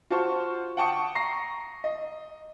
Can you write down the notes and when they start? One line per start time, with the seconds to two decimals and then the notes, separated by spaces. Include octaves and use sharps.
0.10 F4 F#4 C5 A5 C#6
0.77 F#5 G5 A5 C#6 D#6 C#7
1.15 A#5 C#6 A#6 C7
1.84 D#5